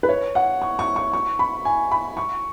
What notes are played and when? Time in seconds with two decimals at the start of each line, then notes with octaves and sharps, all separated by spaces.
0.03 B4
0.09 C#5
0.35 F#5
0.62 C#6
0.79 C#6
0.96 C#6
1.13 C#6
1.39 B5
1.65 G#5
1.91 B5
2.17 C#6